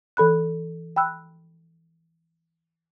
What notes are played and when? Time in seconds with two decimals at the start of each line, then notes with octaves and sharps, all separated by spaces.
0.17 E3 A4 B5 F#6
0.96 G5 B5 E6 F#6